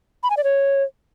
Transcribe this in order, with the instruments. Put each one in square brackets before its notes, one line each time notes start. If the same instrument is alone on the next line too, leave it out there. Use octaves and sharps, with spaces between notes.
[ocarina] B5
G#5
D5
C#5